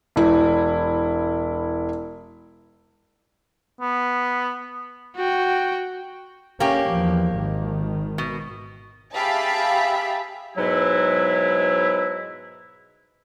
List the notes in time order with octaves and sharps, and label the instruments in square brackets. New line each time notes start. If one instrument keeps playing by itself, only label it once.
[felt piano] E1 E4
[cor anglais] B3
[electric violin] F#4 G5
[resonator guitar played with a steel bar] A#3 G4 [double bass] C#4
[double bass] E2 F3
G#1 D#3
[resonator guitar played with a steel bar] B2
[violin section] G4 G#4 E5 F5 A5 B5
[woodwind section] G#2 B2 F#3 E4